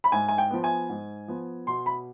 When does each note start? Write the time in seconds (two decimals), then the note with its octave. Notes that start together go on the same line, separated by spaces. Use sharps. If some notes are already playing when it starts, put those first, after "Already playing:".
0.04 B5
0.12 G#2 G#5
0.28 G#5
0.38 G5
0.50 F3 B3
0.64 G#5
0.89 G#2
1.28 F3 B3
1.67 B2 C6
1.86 B5